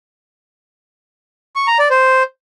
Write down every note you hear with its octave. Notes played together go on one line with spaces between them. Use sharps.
C#6
A#5
D5
C5